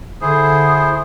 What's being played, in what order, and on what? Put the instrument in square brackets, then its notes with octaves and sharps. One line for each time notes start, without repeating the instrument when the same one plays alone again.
[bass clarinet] D3 [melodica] E4 G#4 C5 [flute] D#6